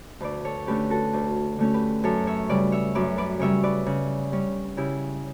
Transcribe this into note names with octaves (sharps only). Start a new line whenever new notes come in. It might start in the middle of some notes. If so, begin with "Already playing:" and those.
D2 B4 D5
A4 C#5
D3 A3 C#4 G4 B4
F#4 A4
D2
D3 A3 C#4
G4 B4
F#2 A4 C#5
C#5 E5
C#3 G3 B4 D5
C#5 E5
F#2 B4 D5
B4 D5
C#3 G3 C#5 E5
B4 D5
C#3
G3 C#4
C#3 E4 G4